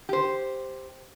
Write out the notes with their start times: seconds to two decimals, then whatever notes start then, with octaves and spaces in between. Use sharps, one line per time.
0.09 G4 C5